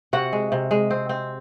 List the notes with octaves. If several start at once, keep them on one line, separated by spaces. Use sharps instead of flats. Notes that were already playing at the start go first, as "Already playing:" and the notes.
C3 F#4 F#5
G#3
C3
G#3
C4
C4